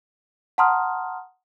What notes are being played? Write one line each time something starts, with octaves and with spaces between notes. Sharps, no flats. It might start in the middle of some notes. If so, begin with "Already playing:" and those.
F#5 A5 A#5 C6 D#6 F6